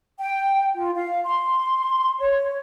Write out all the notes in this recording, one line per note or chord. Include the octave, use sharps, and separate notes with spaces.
G5
F4
F5
C6
C#5